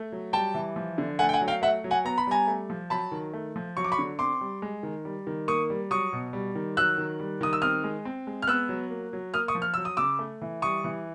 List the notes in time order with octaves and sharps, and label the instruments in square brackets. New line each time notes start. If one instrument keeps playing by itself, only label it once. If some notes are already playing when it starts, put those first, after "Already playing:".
Already playing: [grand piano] A3
F#3
G3 G5 A5
E3
F3
D3
A3 F#5 G#5
G5
F#5 G#5
F#3
F5 G5
A3 E5 F#5
F#3
F#5 G#5
B3 A#5
B5
G3 G#5 A#5
A3
F3
F#3 A5 B5
D#3
A3
F3
F#3 C#6
D6
B5 C#6
D3
C4 C6 D6
G3
G#3
D#3
G3
D#3
A#3 C#6 D#6
G3
F#3 C#6 D#6
B2
G3
D#3
F#3 E6 F#6
D#3
G3
D#3 D#6
E6
C4 D#6 F6
G#3
C4
G#3
F6
B3 E6 F#6
F#3
A#3
F#3
A#3 D#6 F6
C#6 D#6
F3
F6
F#3 E6
D#6
C#3 D6 E6
A3
E3
G3 C#6 D#6
E3